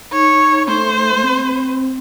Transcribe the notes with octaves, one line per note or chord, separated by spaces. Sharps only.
D#4 C#5
A3 C5
A3
C4